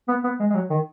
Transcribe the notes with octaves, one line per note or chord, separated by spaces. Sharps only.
B3
B3
G#3
G#3
F#3
D#3